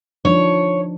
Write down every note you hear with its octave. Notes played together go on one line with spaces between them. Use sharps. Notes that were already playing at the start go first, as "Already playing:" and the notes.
F3 D4 D#4 C#5